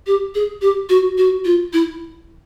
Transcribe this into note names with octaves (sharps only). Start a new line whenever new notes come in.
G4
G#4
G4
F#4
F#4
F4
E4